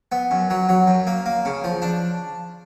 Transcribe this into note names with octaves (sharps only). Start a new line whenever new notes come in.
B3
F#2
F#3
F#3
F#2
A#3
A#3
C#3
F3
D4